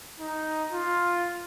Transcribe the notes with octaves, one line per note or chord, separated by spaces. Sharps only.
D#4
F4